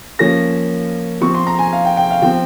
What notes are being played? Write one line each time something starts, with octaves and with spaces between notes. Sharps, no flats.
F3 A#3 C#4 A#6
F3 C4 C#6
C6
A#5
G#5
F5
G5
G5
F5
F3 C4 G5